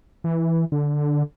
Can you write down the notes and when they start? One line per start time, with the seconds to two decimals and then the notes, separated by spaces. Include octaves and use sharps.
0.24 E3
0.72 D3